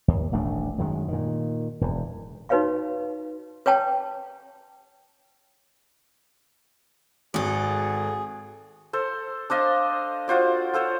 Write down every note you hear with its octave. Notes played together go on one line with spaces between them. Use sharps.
D#2
D#1 A1 A3 D4
F#2 D#3 G#3
A#2 D#3
E1 E2
D#4 F#4 B4 C#5 F5 C#6
B4 C#5 G5 A5
G#1 F#4 G#4 A4
A4 C5
D4 C5 D#5 F5
F4 F#4 C5 D5
F4 A4 C5 C#5